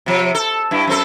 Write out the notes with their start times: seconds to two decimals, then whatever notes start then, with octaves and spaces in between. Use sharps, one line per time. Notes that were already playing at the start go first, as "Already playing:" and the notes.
0.06 C3 F3
0.35 A4
0.71 G2 E4
0.87 F#2 C4 A4